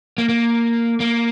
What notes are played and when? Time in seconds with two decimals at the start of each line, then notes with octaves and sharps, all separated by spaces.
0.18 A#3
0.29 A#3
1.00 A#3